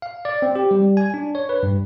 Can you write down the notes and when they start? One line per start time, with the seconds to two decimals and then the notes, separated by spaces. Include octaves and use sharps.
0.02 F5
0.25 D5
0.42 C4
0.55 G4
0.71 G3
0.97 G#5
1.14 D4
1.35 C#5
1.49 B4
1.63 G2